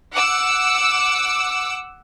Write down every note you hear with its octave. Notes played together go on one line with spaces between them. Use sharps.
F#5 D6 E6